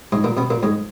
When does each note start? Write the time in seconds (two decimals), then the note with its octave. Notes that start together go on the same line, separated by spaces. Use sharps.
0.12 G#2 G#3
0.24 A#2 A#3
0.37 B2 B3
0.50 A#2 A#3
0.63 G#2 G#3